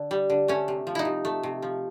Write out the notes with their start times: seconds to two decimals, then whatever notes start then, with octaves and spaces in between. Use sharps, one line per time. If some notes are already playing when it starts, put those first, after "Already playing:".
Already playing: D3
0.11 G3
0.30 D3
0.48 A3 C#4
0.68 C3
0.87 F3
0.95 D#4 E4
1.05 C3
1.25 A3
1.43 C3
1.62 F3